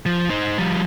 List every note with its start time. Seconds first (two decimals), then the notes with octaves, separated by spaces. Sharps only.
0.06 F3
0.30 D#4 C5
0.58 F3 G3